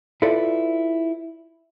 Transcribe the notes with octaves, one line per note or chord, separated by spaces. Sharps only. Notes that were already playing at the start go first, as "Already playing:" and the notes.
E4 F4 A4 B4 D5